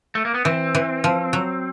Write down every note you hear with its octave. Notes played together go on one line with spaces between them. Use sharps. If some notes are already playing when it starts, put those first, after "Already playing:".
A3
A#3
B3
E3 C4
E3
F3
F#3